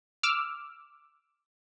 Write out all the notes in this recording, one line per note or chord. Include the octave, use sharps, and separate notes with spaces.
D6 E6 F6